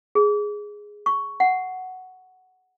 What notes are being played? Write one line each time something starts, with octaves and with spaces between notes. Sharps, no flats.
G#4
C#6
F#5